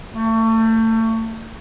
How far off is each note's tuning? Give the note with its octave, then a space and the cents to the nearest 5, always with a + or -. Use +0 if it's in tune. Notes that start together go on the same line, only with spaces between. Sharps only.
A3 +30